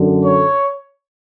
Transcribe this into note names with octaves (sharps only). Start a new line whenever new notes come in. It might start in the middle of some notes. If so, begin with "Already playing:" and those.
Already playing: F#2 D3
C#5